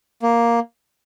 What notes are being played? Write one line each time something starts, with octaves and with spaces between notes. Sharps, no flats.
A#3